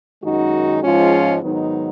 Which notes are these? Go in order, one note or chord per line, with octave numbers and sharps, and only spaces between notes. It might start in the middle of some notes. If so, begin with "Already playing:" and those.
F#2 D#3 G#3 D#4 F#4
G#2 F3 G#3 C#4 F4
G#2 D#3 F#3 B3 D#4